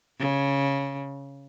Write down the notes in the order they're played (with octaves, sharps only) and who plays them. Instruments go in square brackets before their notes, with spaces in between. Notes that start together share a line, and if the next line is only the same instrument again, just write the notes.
[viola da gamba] C#3